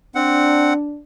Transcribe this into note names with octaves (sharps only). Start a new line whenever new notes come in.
C4 D4 F#5